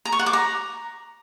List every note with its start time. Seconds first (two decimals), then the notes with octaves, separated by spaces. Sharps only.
0.05 A#5
0.12 C#6
0.19 F#5
0.26 D6
0.33 A#5